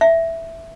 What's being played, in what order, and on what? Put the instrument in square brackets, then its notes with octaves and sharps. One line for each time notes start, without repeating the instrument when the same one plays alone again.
[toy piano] E5